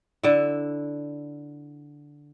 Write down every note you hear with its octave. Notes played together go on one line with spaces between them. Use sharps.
D3 E4